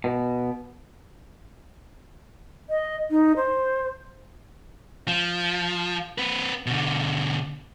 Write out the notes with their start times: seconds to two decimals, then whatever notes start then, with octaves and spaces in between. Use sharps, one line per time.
0.04 B2
2.70 D#5
3.11 D#4
3.36 C5
5.08 F3
6.18 C4 B4
6.66 B2 D3